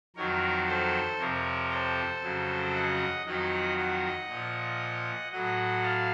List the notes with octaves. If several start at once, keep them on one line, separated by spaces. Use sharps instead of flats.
F2 D#3 F#3 A#4 C#5
A4 C5
F2 C3 F3 A#4 C#5
A4 C5
F2 C#3 F#3
D#5 F#5
F2 D#3 F#3 D#5 F#5
D#5 F#5
A#2 F3
A2 F#3 D#5 F#5
F5 A5